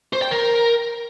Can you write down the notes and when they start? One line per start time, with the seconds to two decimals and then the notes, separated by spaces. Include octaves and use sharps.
0.13 C5
0.22 G5
0.31 A#4